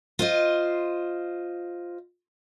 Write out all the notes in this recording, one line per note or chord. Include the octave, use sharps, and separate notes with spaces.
F4 C5 D#5